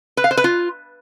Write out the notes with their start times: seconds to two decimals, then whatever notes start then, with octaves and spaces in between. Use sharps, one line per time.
0.17 B4
0.24 F5
0.31 C5
0.37 B4
0.44 F4